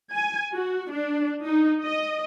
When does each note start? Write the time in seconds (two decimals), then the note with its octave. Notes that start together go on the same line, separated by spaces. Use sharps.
0.15 G#5
0.54 F#4
0.91 D4
1.45 D#4
1.84 D#5